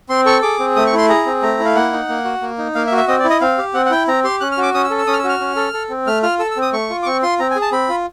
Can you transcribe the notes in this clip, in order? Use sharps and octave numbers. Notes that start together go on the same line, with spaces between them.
C4 C6
A4 C#6
G#4 D6
C4
A3 D#6
C#6
E4
C6
G#4 A#5
C4
A3 A#5
E4
F5
A#3 F#5
D#4
A#3
F#4
A#3
D#4
A#3 F5
E5
F#4
E5
C4 D#5
D5
E4
D#5
C4 F5
G4
C4 F#5
F#5
E4 G5
C4 A#5
G4 C6
C#4 F#6
F6
F#4 D6
C#4 D#6
E6
A4
E6
C#4 D#6
F6
E6
F#4 F6
C#4
A4
A4
C4
A3 F6
F4 F6
A4 E6
E6
C4
D#6
A3 C#6
F4
D6
C4 C#6
F4 C6
C4 A#5
G#5
G#4
A5
C4 B5
F4